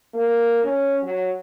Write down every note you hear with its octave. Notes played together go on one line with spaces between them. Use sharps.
A#3
C#4
F#3